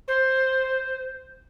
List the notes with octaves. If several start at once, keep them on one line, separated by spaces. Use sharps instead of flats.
C5